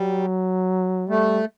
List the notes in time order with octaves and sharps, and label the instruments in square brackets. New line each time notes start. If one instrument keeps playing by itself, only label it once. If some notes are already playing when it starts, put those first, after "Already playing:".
Already playing: [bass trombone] F#3 [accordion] G3
[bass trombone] G3 [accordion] A3